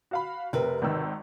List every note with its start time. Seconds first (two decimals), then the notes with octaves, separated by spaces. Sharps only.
0.11 F#4 F5 B5
0.53 F1 C3 A#4 B4
0.82 G#1 D#3 E6